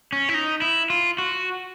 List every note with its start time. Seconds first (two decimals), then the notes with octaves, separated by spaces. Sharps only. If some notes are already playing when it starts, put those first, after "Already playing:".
0.12 C#4
0.29 E4
0.34 D#4
0.62 E4
0.90 F4
1.18 F#4